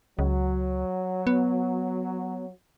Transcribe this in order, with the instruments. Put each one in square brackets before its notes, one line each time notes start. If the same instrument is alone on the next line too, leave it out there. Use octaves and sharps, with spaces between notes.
[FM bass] C#2 [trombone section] F#3
[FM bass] B3